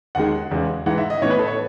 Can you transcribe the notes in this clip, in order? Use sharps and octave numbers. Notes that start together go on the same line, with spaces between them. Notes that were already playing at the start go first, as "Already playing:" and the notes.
D#2 D#3 G#3 F#5
E2 C#3 G#3
G#2 E3 G#3 F#5
E5
D#5
A2 E3 B3 C#5
B4
A4
C#5